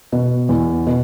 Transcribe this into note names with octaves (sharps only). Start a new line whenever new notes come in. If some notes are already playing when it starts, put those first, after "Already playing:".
B2
E2
B2